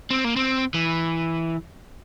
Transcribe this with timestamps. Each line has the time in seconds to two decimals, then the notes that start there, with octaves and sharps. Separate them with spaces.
0.10 C4
0.24 A#3
0.36 C4
0.74 E3